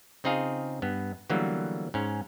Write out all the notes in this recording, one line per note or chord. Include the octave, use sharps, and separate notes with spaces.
C#3 C4 D#4 F4 G#4 F5
G2 B3
D3 E3 F#3 G3 A#3 B3
G#2 C#4